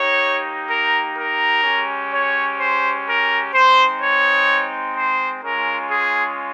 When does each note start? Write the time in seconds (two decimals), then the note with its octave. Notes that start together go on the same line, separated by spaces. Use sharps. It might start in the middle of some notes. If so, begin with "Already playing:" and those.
Already playing: A#3 D#4 G4 C#5
0.68 A#4
1.16 A#4
1.63 G#3 C#4 G4
2.12 C#5
2.58 C5
3.06 A#4
3.53 G#3 C4 D#4 C5
4.00 C#5
4.95 C5
5.43 G#3 C#4 F4 A#4
5.90 G#4